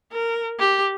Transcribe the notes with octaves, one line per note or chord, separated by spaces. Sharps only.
A#4
G4